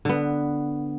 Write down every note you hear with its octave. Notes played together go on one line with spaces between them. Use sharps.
D3 B3